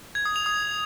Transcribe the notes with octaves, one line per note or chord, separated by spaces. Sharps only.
G#6
D#6
F7
D#6